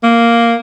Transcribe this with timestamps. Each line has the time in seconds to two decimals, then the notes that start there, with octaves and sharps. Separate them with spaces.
0.04 A#3